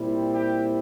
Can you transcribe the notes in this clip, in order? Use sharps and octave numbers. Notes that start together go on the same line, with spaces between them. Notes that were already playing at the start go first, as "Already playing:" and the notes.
Already playing: A#2 G3 C4 E4
G4